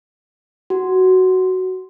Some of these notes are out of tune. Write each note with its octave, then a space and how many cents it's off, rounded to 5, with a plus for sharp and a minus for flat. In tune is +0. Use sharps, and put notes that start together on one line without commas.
F#4 +10